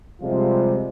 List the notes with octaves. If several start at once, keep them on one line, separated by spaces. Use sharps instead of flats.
C3 F3 G3 G#3 F4